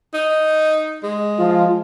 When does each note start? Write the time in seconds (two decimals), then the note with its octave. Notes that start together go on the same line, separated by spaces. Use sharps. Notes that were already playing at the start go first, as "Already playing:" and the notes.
0.14 D#4
1.03 G#3
1.40 F3 F4